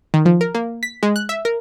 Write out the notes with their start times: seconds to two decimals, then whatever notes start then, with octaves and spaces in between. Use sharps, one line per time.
0.14 D#3
0.25 F3
0.41 A#4
0.55 A#3
0.83 B6
1.03 G#3
1.16 F#6
1.29 E5
1.45 A#4